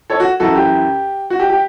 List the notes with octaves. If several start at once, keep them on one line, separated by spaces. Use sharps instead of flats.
A4 C#5
F#4
F#2 E3 F#4 A4
G4
F#4
G4
G4